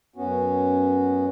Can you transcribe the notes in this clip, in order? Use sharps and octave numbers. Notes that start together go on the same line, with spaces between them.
F#2 B3 C#4 F#4